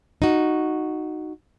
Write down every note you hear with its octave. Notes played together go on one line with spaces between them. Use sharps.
D#4 F#4